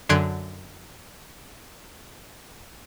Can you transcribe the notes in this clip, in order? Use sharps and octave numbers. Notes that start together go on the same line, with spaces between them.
F#2 D3 C6 F#6 G#6 D7